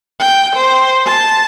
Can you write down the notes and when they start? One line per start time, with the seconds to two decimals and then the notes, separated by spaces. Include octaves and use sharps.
0.19 G5
0.56 C5
1.06 A5